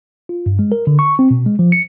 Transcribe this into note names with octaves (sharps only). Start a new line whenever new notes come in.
F4
G2
G#3
A#4
D3
C#6
C4
B2
G#3
F3
C#7